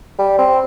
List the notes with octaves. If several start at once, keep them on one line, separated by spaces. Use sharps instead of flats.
G3
C4